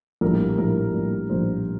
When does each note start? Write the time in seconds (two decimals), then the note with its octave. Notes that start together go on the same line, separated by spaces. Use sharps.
0.21 A#1 A2 G3 A#4
0.58 A#1 A2 G3 A#4
0.94 A#1 A2 G3
1.30 A#1 A2 G3 C5